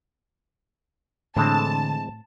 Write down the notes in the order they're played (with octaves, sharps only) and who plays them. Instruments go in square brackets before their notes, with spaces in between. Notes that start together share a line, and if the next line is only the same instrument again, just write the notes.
[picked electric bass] A2 [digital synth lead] D3 [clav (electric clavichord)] E3 G#3 C4 [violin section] A5